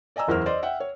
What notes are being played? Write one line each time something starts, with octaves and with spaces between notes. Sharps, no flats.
D5 D#5 G#5 A#5 E6
F#1 E2 E4 A#4 C5 F6
C5 D5 D#5 C6
E5 F#5 G5
C#5